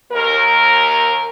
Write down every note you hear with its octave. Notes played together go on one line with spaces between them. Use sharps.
D#2 A#4